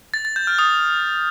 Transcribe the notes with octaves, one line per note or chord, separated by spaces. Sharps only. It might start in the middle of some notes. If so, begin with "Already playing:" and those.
A6
A6
G6
F6
D#6